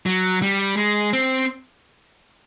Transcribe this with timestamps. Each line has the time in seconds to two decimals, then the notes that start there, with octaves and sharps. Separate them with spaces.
0.06 F#3
0.42 G3
0.77 G#3
1.13 C4